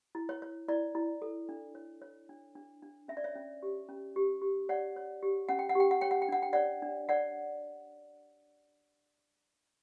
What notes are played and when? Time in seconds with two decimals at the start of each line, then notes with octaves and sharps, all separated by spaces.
0.15 E4
0.29 C#5
0.42 C#5
0.68 E4 D5
0.95 E4
1.22 A4
1.49 D4
1.75 C#5
2.02 C#5
2.29 D4
2.55 D4
2.82 D4
3.08 C#4 E5
3.17 D5
3.24 C#5 E5
3.35 C#4
3.62 G4
3.89 C#4
4.16 G4
4.42 G4
4.69 C#5 D5 F#5
4.96 C#5
5.23 G4
5.49 C#4 F#5
5.59 G5
5.69 F#5
5.75 G4 G5
5.91 F#5
6.01 C#5 G5
6.11 F#5
6.22 G5
6.29 D4 F#5
6.42 G5
6.53 C#5 D5 F#5
6.82 D4
7.09 C#5 D5 F#5